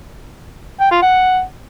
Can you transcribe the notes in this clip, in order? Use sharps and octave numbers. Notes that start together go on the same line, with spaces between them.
G5
F4
F#5